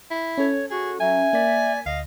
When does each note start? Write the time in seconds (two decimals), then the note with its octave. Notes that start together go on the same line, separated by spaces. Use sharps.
0.11 E4
0.38 C#4 A4 C#5
0.70 F#4 G#4
1.00 F#3 E5 G#5
1.33 A#3 D5 B6
1.86 D2 D#5 F5